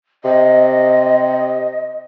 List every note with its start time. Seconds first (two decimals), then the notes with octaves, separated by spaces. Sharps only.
0.24 C3 D#5